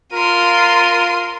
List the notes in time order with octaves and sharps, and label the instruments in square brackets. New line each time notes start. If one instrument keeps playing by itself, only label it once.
[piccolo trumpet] F4 [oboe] A#4 [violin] C6 D#7